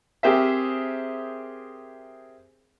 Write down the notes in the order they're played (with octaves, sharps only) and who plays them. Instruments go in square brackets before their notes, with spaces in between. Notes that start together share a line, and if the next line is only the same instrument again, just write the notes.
[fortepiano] C4 G4 G#4 A#4 C5 E5